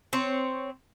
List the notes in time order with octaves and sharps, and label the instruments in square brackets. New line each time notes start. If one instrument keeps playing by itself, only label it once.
[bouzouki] C4 C#5